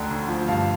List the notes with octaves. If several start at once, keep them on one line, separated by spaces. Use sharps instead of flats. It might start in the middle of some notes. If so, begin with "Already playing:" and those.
Already playing: D2 D3 G5 A#5
D2
F3
G2 F5 A5